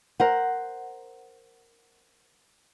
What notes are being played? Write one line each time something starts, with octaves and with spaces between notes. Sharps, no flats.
A#4 C5 F#5